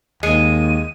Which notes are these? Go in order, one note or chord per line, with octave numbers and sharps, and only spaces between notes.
D#2 G#3 D#7